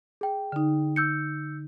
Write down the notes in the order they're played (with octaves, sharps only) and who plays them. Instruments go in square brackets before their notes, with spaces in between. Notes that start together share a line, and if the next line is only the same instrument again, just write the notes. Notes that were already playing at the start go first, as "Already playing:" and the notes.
[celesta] G#4 G5
[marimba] D3 D#4
[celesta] E6 G6 C#7